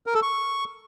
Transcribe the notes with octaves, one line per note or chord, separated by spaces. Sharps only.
A#4
A4
C#6